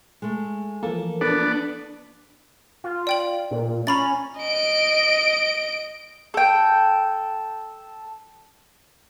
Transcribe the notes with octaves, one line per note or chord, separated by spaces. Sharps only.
G#3 A3
E3 F3 A#3 A4
B3 D4 A4 B4 D5
F4
D5 G5 F#7
A#2
C#4 A#5 B5 A6
D#5 D7
A4 G5